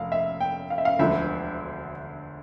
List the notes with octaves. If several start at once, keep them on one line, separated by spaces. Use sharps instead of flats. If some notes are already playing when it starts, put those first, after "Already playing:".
Already playing: F1 F5
E5
G5
F5
E5
F5
E1 D2 D3 F3 E5